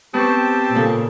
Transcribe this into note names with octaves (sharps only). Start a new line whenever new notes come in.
B3 C4 G4 A5 C#6
A#2 C#3 A#3 A4